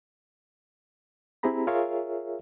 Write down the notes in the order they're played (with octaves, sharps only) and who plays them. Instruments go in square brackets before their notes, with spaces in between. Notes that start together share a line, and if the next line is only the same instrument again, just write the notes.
[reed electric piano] C4 E4 G4 G#4 A#5 B5
F4 G#4 A#4 C#5 E5 F5